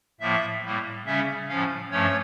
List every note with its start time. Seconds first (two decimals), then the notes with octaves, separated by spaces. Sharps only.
0.20 A2 F3 A#3 E5
0.63 A2 G3 A#3
1.05 C#3 G3 C#4 E5
1.49 A2 F3 C#4 F5
1.91 G2 F3 A3 C#4 C#5